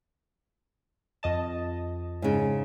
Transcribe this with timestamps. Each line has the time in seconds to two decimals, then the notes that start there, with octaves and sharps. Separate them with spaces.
1.23 F2 D#5 A5
2.22 G#2 C#3